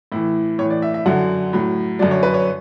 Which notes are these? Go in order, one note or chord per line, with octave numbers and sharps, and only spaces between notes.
A2 E3 E4
A2 E3 C#5
D5
E5
E5
F#2 D3 F#3 F#5
A2 F#3
F#2 D3 F#3 D5
C#5
B4
C#5